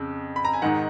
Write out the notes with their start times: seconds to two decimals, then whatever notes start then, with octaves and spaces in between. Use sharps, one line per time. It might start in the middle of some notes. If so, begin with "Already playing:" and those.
Already playing: F2 C#3
0.36 B5
0.45 A#5
0.53 G#5
0.62 G#2 D#3 F#5